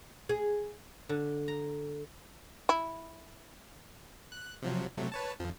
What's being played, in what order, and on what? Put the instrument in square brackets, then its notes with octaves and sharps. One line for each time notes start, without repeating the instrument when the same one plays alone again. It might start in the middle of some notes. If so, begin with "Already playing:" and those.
[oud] G#4
[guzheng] D3
A#5
[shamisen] E4
[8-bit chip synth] F#6
C3 F3 F#3
C3 F#3 A3
B4 C#5 A5
F2 F3